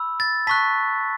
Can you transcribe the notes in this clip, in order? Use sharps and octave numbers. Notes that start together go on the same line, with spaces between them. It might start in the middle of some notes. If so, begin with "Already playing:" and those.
Already playing: B5 E6
A6
A5 C#6 F#6 B6